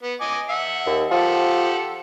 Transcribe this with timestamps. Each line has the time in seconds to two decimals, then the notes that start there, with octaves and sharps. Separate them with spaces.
0.03 B3
0.21 D#5 G#5 D6
0.49 E5 F#5
0.86 D#2
1.11 F3 G4 A4 F#5